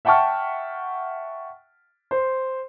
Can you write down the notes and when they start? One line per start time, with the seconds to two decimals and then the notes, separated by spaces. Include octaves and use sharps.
0.05 E5 F#5 G5 A5 C#6 F6
2.11 C5